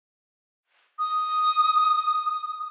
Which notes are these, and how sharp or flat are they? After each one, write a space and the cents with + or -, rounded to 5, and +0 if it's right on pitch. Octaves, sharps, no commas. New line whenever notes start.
D#6 +0